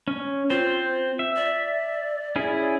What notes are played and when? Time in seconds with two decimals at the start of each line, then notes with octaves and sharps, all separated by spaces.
0.08 C#4
0.50 C4 F4 C5
1.19 E5
1.36 D5
2.36 C#4 E4 G#4